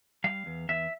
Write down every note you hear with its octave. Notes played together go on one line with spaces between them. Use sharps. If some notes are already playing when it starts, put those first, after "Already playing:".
G3 F5
E2
E2 E5